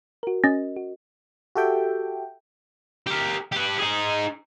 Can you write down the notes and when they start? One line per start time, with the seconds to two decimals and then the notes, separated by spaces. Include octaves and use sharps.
0.23 F#4 A#4
0.44 C#4 D#5 A6 A#6
0.76 F#4
1.55 F#4 G4 A4 E5 G5
3.07 G4 A#4
3.52 G4 B4
3.79 D#4 G#4